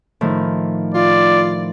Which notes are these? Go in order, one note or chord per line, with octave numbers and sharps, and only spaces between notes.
A2 D#3 F3
F4 D5